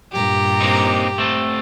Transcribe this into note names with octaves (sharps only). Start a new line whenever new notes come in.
G2 A#2 G4 A#5
A#3 C4 D#4
A3 C4 A4